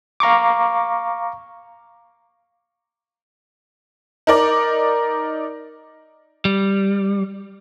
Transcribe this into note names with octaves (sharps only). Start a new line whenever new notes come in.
F5 A#5 C#6 D6
D#4 A#4 D5
G3